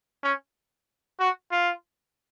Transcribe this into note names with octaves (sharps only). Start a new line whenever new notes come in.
C#4
F#4
F4